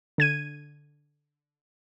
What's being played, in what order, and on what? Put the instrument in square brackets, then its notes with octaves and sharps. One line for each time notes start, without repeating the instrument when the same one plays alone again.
[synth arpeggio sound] D3 G#6 D#7